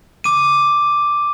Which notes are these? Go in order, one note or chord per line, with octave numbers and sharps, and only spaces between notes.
D6 D#7